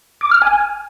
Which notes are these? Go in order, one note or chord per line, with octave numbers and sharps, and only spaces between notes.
D6
F6
G#5